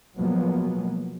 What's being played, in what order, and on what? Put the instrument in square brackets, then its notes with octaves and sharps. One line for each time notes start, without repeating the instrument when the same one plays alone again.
[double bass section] B2 F3 F#3 G#3 A#3 B3